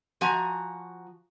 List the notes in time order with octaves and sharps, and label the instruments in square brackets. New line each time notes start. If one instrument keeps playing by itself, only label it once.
[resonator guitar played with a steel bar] F3 F#4 G#5 A#5